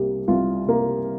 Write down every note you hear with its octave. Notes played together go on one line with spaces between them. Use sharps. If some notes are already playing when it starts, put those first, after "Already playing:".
Already playing: C2 C3 G3 A#3
C2 F4
C3 G3 A#3